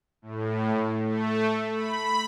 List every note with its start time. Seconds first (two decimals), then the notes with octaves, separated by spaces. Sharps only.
0.22 A2
1.03 A3
1.72 B5